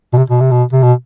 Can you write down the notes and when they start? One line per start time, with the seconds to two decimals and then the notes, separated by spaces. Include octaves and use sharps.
0.13 B2
0.18 C3
0.30 B2
0.41 C3
0.51 B2
0.73 C3
0.83 B2